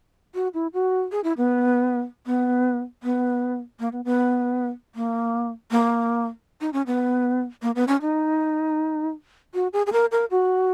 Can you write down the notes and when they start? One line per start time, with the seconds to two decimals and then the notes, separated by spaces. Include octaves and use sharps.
0.35 F#4
0.54 E4
0.74 F#4
1.12 G#4
1.24 E4
1.37 B3
2.26 B3
3.03 B3
3.80 A#3
3.93 B3
4.05 B3
4.95 A#3
5.71 A#3
6.61 D#4
6.73 C#4
6.87 B3
7.62 A#3
7.75 B3
7.88 C#4
8.01 D#4
9.54 F#4
9.73 G#4
9.87 G#4
9.93 A#4
10.12 A#4
10.31 F#4